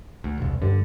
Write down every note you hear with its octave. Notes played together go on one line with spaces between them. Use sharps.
D2
E1 C2
G2 D3